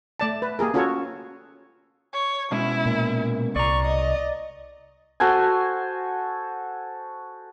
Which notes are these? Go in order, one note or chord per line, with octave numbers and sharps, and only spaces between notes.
A3 D5 A5
B4
A#3 G4 G#4 A#4
C#4 F4 F#4 A4 C#5
C#5
B2 G#3 C#4 E4
A#2
C2 D5 A#5 C#6
D#5
F#4 A4 C5 G#5